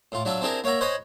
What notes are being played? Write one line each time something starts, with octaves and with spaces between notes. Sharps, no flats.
A2 F4
F#3 D4 F4 E5
C4 D4 E4 G4 G#4 A#4
A#3 C#5 E5 F#5 A#5
C5 C#5 D#5 F#5 G#5 B5